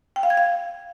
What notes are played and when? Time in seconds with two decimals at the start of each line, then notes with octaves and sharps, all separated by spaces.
0.16 G5
0.23 F5
0.30 G#6
0.37 F5